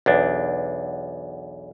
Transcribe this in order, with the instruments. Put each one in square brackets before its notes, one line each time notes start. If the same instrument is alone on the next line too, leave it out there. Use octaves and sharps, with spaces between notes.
[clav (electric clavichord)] B1 E2 D4